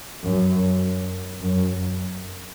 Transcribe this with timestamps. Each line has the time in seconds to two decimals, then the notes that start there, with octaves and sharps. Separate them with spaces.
0.23 F#2
1.42 F#2